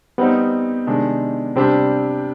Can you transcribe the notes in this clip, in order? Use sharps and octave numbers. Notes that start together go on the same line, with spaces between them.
G3 B3 C4 D#4
C3 D#3 G#3 D4
C3 G3 C4 D4 G4